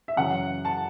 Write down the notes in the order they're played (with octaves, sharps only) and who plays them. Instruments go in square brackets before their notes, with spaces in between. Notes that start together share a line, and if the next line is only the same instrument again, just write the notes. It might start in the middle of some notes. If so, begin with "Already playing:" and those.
[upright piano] E5
F#2 C#3 E3 C#4 F#5
A5